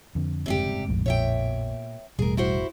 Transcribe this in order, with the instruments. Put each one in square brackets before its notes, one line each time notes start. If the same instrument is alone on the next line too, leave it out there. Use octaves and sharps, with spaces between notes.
[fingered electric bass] F2 D3
[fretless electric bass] F#1 G#2 [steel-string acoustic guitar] C3 G3 G4
[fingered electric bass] A#1 F2 A2
[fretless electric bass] A#2 B3 [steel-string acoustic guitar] C#5 E5 G5
[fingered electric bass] E1 A1 A3 [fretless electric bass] B2 G3 [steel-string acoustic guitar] G#4 A#4
[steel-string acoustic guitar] E4 F#4 C5